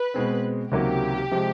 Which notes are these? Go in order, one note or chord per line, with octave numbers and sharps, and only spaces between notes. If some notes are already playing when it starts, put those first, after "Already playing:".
Already playing: B4
B2 G#3 C4
C#2 C3 D#3 F#3 A#3 G4
C3 F3 G#3